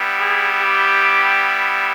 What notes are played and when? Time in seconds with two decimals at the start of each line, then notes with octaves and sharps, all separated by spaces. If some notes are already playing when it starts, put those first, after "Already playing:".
Already playing: G3 B3 E4
0.19 G#4
0.61 G4